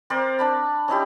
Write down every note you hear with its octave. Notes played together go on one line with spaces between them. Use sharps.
C4 A#4 C5 D5
D4 A5 B5
C#4 D#4 E4 G4